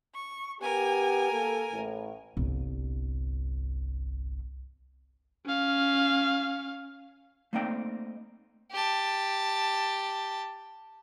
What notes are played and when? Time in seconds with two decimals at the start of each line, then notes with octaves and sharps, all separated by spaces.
0.14 C#6
0.61 B3 G4 A#4 G#5
1.31 A#3 A4
1.73 A1 A2
2.37 G1 C2
5.46 C#4 F5
7.53 A3 A#3 C4 D#4 D5 G5
8.71 G4 A5